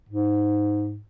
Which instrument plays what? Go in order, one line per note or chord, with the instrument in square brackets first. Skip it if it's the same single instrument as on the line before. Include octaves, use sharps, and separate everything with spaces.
[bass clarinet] G#2